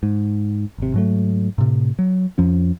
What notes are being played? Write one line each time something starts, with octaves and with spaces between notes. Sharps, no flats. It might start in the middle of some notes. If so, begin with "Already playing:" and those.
G#2
G#1 C3
G#2 F#3 A3
A2 C3
F#3
F2 F3 C#4